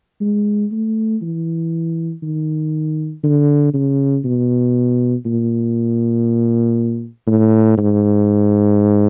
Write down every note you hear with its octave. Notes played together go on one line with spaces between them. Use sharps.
G#3
A3
E3
D#3
D3
C#3
B2
A#2
A2
G#2